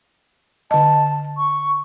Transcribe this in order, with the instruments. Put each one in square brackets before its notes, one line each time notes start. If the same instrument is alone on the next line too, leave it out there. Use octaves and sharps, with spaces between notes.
[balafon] D3 D#5 [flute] A5
[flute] C#6